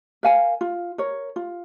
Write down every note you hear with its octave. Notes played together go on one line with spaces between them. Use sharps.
A#4 F5 G#5
F4
A#4 C#5
F4